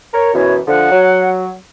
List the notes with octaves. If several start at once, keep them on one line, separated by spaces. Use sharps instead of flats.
A#4 C#5
F#2 B2 E3 C#5
D3 F3 F#5
F#3